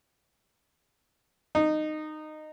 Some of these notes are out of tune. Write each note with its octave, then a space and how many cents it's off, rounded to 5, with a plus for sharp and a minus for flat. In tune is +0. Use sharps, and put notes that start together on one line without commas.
D#4 -15